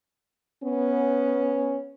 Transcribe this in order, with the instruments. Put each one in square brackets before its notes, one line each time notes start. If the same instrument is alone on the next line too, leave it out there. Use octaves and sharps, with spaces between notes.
[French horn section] B3 C#4